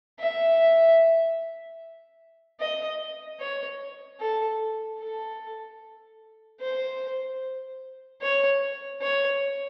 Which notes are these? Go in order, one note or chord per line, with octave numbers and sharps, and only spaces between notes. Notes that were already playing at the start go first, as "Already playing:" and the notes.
E5
D#5
C#5
A4
A4
C5
C#5
C#5